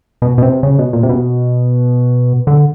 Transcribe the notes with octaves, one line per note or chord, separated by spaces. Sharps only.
B2
B2
C3
C#3
B2
A#2
C3
B2
D3